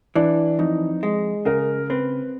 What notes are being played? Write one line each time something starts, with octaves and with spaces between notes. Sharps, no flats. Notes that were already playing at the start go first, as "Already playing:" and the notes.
E3 D4
F2 D#4
G#3
C#3 A#4
C4 B4